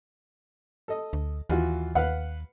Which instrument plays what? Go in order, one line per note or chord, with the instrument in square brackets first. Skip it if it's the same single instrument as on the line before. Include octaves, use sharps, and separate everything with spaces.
[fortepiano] A4 D#5
[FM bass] D2
[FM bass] D#2 [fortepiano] E3 F4 F#4
[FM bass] D#2 [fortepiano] B4 F5 F#5